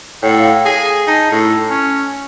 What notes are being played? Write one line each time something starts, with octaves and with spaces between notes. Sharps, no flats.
A2 C#5 F#5 G5
F5 G5
G#4 A#6
D#4 A5
A2
C#4